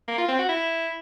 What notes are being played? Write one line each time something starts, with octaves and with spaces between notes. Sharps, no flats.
A#3
F4
C4
F#4
E4